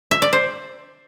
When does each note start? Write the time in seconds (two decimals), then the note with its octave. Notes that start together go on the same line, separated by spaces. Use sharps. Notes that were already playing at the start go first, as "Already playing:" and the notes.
0.11 E5
0.22 D5
0.33 C5